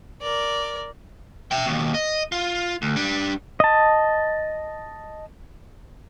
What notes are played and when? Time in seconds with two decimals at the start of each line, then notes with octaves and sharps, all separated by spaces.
0.22 A#4 D5
1.51 E5 G5
1.66 D#2 B2
1.94 D#5
2.32 F4
2.82 D2
2.96 G3 D4
3.60 D#5 A5